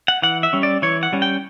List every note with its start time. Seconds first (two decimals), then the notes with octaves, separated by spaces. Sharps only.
0.08 F#5
0.22 E3 F#5
0.43 E5
0.53 G3 C#4
0.63 D5
0.82 E3 C#5
1.03 F#5
1.13 G3 C#4
1.22 G5